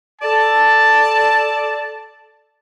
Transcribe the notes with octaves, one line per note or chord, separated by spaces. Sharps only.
A4 D5 A5